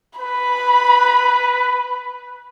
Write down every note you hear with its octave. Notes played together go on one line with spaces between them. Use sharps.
B4 B5